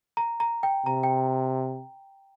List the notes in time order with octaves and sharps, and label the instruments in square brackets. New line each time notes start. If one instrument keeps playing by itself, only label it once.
[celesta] A#5
A#5
G5
[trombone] C3 [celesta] A#5
[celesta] G5